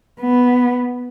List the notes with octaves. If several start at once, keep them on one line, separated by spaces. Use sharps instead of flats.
B3